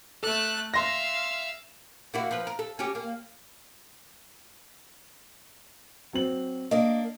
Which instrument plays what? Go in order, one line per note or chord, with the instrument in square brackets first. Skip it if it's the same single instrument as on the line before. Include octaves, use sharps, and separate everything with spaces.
[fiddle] A3 F#6 [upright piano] A4
[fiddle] E5 F5 [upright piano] C6 A#6
[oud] A#3 E4 F#4
F3 B4
A#4
A4
C#4 F#4 G4
A#3
[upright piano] F#3 C4 F#7
[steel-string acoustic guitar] A#3 D4 [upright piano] D#5